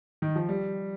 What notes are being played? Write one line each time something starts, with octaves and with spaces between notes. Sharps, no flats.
D#3
F3
G3